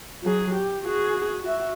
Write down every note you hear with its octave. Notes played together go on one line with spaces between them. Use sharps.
F#3 G#4
G4
F#4 G#4
F#4 E5